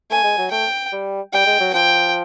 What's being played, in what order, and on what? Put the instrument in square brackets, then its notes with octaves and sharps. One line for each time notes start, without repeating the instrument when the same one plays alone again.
[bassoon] A3 [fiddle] G#5
[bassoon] G#3
F#3
[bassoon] A3 [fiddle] G5
[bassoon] G3
[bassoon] G3 [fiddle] G5
[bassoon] G#3
F#3
[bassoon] F3 [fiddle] G5